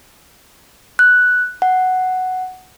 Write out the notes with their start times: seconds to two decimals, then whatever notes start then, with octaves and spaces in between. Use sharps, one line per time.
0.99 F#6
1.62 F#5